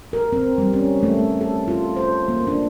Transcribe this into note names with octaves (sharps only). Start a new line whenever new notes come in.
A#4
C4
G3
C#4
A3
A4
F4
C5
A#3
D4